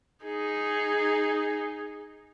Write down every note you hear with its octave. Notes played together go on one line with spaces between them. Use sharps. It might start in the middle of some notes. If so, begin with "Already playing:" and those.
D#4 G#4